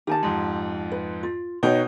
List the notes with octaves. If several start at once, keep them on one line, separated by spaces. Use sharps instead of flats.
D#3 G4 G#5 A5
F2 G#2
B4
F4
B2 D#4 C#5 G5 G6